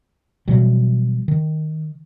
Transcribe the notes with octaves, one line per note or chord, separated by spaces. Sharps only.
B2 E3 F#3 G3
D#3